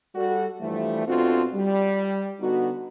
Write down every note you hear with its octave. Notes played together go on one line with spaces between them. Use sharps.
G3 F#4 A4
G2 E3 F3 G3 A3
B2 C4 D4 F4 F#4 A4
G3
D3 B3 D#4 F#4